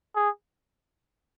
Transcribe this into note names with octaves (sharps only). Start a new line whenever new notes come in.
G#4